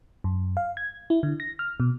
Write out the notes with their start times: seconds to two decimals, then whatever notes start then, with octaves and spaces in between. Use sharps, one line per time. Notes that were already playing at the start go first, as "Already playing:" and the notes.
0.24 F#2
0.57 F5
0.77 G#6
1.10 E4
1.23 D3
1.40 A#6
1.59 F6
1.80 B2